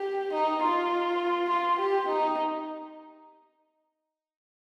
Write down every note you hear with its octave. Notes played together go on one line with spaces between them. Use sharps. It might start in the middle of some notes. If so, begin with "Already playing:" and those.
Already playing: G4
D#4
F4
F4
G4
D#4